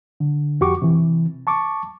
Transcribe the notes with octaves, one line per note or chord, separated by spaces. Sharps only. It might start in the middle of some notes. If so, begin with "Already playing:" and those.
D3
F2 F#4 G4 C#6 D6
C3 E3
A5 C#6 D6